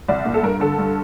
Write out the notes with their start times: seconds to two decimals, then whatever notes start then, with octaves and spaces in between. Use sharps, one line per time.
0.09 C2 D5
0.25 A#2
0.34 A4
0.43 G2 A#4
0.60 D3 A4
0.78 G2